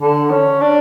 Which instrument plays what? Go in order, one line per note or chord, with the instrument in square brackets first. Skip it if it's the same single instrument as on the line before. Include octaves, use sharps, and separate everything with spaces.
[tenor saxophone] D3
C#4
D4